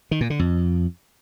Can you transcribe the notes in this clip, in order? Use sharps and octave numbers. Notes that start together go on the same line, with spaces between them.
D#3
A#2
D3
F2